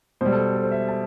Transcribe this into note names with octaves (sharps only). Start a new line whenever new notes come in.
B2 G3 C5
A4
A4
C5
E5
A5